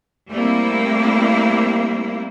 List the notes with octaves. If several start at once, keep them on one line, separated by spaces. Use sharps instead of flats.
G3 A3 A#3 C4 E4